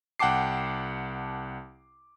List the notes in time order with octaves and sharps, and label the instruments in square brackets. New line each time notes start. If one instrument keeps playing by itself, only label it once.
[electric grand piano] C2 F#5 G5 A5 D6 C7